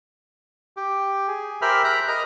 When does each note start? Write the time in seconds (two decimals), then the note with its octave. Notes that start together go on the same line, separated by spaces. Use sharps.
0.77 G4
1.27 G#4
1.62 G4 A#4 C5 E5 B5 F6
1.84 A#5 B5 F#6
2.08 A#4 D#5 A#5